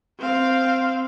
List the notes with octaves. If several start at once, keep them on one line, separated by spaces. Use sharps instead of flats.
C4 F5